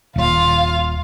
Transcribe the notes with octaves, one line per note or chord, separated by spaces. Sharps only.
D#1 F4 F5